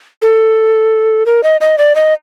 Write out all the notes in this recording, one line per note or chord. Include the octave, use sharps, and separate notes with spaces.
A4
A#4
D#5
D#5
D5
D#5